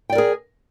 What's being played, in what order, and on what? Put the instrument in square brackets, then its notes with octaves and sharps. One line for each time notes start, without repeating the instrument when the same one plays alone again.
[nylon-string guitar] G5
D5
A#4
G#4